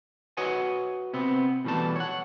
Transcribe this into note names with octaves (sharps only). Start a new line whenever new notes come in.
F#4 B4 C#5 D#5 F#5 G#5
C3 B3 C4
B2 E3 G3 A3 A5
C#5 F#5